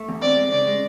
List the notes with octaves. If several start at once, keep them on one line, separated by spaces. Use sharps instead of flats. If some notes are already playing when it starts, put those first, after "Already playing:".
Already playing: A3
E2
C4 D5
G#3
C#3 D5
G#3